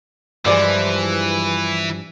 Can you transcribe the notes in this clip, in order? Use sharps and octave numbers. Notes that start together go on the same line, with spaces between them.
G2 E3 F3 G#3 C5 D5 D#5